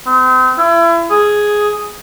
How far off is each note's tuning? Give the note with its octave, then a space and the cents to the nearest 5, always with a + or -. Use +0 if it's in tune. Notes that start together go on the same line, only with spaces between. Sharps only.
C4 -40
E4 +35
G#4 +5